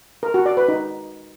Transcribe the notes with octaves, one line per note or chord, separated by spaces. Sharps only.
A#4
F#4
D5
B4
D#4